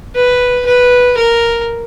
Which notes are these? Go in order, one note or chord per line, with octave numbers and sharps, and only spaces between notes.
B4
B4
A#4